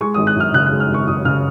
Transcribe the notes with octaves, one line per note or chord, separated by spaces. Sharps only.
G#3 C#6
D#6
G#1
F#6
F#2 F6
C#3 F#6
F#6
G#3
F6
G#1 C#6
F#2 D#6
C#3 F6